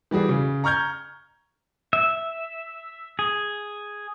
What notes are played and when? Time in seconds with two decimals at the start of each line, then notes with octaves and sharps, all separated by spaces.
0.11 E3 G3 F#4 G#4 D5
0.29 C#3
0.64 A#5 C#6 F6 G6 G#6
1.93 E5
3.19 G#4